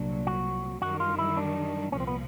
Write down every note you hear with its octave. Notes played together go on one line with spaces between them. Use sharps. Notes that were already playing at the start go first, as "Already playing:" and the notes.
Already playing: C2 A#2 F#3 D4
F#4
F#2 D#3 G3 F#4
F4
E4
D4
C2 A#2 F3 C#4
C4
B3